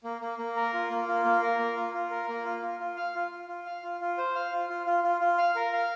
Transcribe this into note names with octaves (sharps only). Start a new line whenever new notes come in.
A#3
A#3
A#3
A#4
F4
A#3
F4
A#3
A#4
A#3
F4
F4
A#4
A#3
F4
F4
F4
F5
F4
F4
F4
F5
F4
F4
C5
F5
F4
F4
F4
F4
F4
F5
A#4
F5